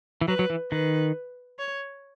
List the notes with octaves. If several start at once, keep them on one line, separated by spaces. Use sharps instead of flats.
E3
F#3 B4
F#3
E3
D#3 B4
C#5